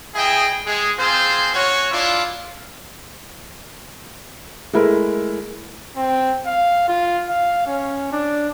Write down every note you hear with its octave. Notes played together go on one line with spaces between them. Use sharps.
E4 G#4 D#5 G5
G#3 G#4
C4 F4 G#4 C5
C#4 F#4 C#5
D4 E4 F4
G#3 A3 E4 A#4
C4
F5
F4
F5
C#4
D4